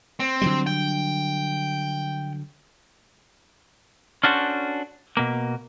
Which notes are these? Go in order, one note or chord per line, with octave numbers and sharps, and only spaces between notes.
C4
D3 F#3 G3
G5
C#4 D4 F#4 A4 C5
B2 A#3